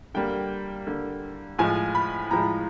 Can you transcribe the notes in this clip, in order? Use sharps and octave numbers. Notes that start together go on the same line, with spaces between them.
D3 G3 A#3 G5
D3 G3 A#3
A2 F3 G#3 G#5
B5
A2 F3 G#3 A#5